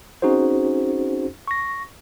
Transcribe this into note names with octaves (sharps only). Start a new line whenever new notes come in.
C4 C#4 D#4 F#4 G#4 C5
C#6 A#6